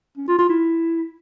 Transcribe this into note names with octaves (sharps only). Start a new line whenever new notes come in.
C#4
F4
F4
E4